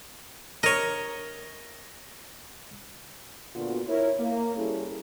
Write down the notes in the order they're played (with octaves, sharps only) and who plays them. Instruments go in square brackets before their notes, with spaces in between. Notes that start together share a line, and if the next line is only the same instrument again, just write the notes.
[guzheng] A#4 [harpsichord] C#5 D#5
[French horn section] A#2 D3 B3 F4 F#4
E4 A#4 C#5
A#3
G3 C#4 E4 G#4 A4